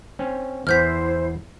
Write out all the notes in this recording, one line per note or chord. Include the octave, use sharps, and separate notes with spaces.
C4 C#4
E2 E3 B3 E4 C5 F6 G6 B6